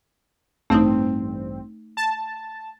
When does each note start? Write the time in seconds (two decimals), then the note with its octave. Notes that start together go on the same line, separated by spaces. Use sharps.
0.70 A1 G2 A3 C4 D#4
1.97 A5